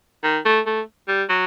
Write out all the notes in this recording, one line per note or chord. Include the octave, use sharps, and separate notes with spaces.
D#3
A3
A3
G3
F#3